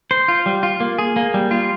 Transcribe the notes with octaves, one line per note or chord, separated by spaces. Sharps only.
C5
F4
G3
F4
A#3
G#4
A#3
G3
F4